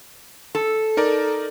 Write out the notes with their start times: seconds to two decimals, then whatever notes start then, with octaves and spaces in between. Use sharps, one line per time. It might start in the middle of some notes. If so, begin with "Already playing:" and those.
0.55 A4
0.97 D#4 A#4 D5